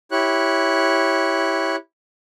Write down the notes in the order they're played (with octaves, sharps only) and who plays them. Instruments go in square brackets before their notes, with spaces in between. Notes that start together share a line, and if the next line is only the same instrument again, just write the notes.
[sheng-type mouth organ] E4 G4 C#5 F#6